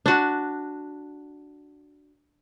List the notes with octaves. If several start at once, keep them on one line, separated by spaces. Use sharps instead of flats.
D4 F#4